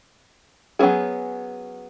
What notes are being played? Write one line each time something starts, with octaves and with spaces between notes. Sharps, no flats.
F#3 B3 C#4 F#4 G#4